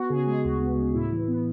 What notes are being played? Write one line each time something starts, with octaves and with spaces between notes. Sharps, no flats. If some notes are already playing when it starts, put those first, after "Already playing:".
Already playing: B3 F#4
C#3 G#4
G#3 G#4
D2 F#4
B3
C#3
A2 E4
E3
B3